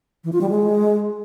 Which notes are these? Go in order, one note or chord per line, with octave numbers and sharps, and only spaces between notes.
E3
F4
G3
G#3